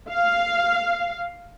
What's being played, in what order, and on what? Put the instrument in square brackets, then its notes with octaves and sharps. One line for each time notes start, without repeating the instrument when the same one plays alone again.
[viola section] F5